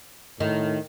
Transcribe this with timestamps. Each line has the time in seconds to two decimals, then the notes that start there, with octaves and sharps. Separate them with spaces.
0.40 A2 D#3